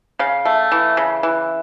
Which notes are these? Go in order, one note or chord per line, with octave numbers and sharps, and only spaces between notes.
C#3 F5
A3
E3
C#3
E3